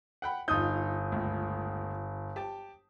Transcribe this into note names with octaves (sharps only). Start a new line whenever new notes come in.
F#5 G5 B5
G1 D#4 F4 D#6 G6
C#2 A2
G4 A5